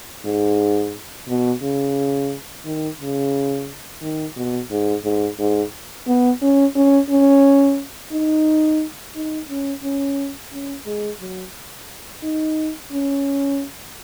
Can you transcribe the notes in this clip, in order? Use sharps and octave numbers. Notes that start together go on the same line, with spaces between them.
G#2
B2
C#3
D#3
C#3
D#3
B2
G#2
G#2
G#2
B3
C#4
C#4
C#4
D#4
D#4
C#4
C#4
C#4
G#3
F#3
D#4
C#4